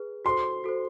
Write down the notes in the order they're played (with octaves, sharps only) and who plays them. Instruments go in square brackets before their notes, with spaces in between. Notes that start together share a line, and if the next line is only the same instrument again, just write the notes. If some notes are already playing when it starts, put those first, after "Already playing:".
Already playing: [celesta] G#4 B4
[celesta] F#4 A4 C5 [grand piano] C6
[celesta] F#4 A4 C5